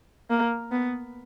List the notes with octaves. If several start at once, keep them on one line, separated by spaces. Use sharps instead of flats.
A#3
B3